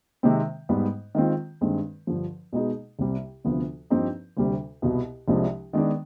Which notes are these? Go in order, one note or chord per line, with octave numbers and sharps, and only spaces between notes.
C3 D#3 G#3 C4
G#2 G3 B3
D#3 G#3 C4 F4
G2 D#3 G#3 C4
G2 D3 F3
B2 G#3 B3 D#4 G#4
C2 C3 G3
D2 C3 F3 B3 F4
G2 F3 C4 D#4 G4
D2 C3 G3
C2 B2 B3
C2 C3 F3 G#3 D4
D#3 G#3 B3 D4